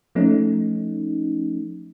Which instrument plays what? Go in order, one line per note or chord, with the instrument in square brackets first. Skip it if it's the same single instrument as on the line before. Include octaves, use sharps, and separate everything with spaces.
[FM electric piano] F3 A3 C#4 D#4